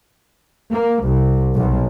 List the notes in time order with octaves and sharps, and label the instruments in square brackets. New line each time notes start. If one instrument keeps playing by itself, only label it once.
[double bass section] A#3
C2
B1